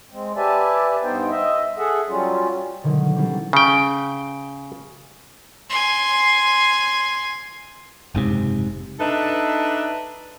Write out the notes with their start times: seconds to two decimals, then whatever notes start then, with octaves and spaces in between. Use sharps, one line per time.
0.12 G#3 C4
0.36 G4 B4 D5 E5 G#5 A5
1.03 G2 B3 D#4 C5 G5
1.30 D#5 E5
1.78 G#4 A4 E5 F#5
2.09 F#3 G3 C#4 F4
2.83 B2 D3 D#3 F3 F#3 G#3
3.15 F#3 G3 C4 C#4 E4 A4
3.53 C#3 G5
5.70 G#5 C6
8.15 F#1 G#2 C3
9.00 D4 D#4 A4 B4 E5